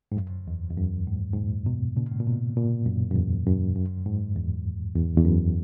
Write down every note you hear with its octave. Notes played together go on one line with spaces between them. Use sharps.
G#2
F#2
E2
E2
F#2
G#2
G#2
A#2
B2
A#2 C#3
G#2
A#2
B2
A#2
F#2
F#2
E2
F#2
F#2
G#2
E2
E2
E2
F#2